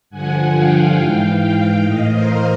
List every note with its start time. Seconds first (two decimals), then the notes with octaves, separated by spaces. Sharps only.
0.10 G2 D3 F3 F#5 G#5
0.53 F5 G5
0.96 G#2 E3
1.82 A2 E3 D#5 F5
2.11 A#4 C5